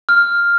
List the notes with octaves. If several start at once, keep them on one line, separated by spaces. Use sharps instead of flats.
F6